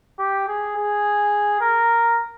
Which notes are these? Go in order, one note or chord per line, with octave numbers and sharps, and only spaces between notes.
G4
G#4
G#4
A#4